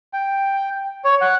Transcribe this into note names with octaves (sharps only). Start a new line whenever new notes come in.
G5
C#5
F#5